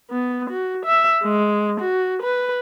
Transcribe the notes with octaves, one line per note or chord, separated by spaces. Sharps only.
B3
F#4
E5
G#3
F#4
B4